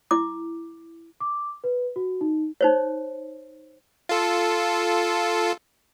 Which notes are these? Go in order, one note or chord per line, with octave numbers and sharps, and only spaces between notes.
E4 D6
D6
B4
F#4
D#4
D#4 C5 C#5
F4 A4